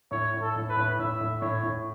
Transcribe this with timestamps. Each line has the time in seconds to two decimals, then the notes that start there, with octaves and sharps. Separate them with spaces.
0.11 A2 C#5
0.34 A2
0.41 A4
0.56 A2
0.69 B4
0.77 A2
0.99 A2 E5
1.21 A2
1.41 A2 C#5
1.63 A2